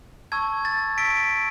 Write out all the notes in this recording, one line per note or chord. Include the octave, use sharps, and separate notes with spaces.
A5 C#6 E6 G#6
A6
A5 C#6 E6 B6 D7